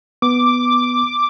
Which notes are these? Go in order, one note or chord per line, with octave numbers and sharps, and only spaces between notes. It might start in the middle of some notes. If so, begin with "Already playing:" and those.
B3 D6